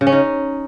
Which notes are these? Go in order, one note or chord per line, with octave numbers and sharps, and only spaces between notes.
C#3
C#4
D#4